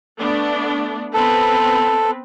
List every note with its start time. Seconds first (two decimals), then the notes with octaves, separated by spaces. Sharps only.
0.19 A3 B3 D4
1.14 B3 C4 A4 B4